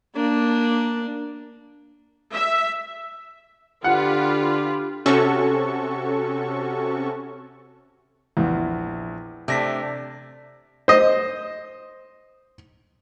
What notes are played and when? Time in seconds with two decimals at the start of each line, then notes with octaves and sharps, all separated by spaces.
0.16 A#3 D4
2.32 E5
3.84 D3 F4 G4 B4 F#5
5.06 C3 C#4 F#4 A4 C#6
8.37 A#1 E2
9.48 C3 A3 D4 A#6 B6
10.88 C5 D#5